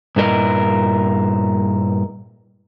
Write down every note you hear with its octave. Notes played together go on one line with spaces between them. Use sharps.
G2 A#2 E4 A#4 D#5